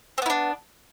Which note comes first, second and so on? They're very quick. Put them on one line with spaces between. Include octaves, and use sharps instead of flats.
C4 B3 E4 D4